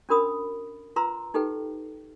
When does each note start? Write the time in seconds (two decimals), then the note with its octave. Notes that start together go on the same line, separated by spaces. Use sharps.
0.09 C#4 D4 F#4 A#4 B5 D#6
0.96 F4 B4 A#5 C6 E6
1.34 D#4 G4 A4 B4 G5